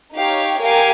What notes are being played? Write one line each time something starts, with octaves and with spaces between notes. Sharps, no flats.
D#4 G4 C#5 F5
G4 A#4 F5 G#5